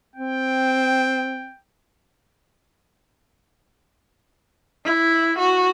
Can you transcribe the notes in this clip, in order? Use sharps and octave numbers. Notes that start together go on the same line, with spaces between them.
C4 G5
E4
F#4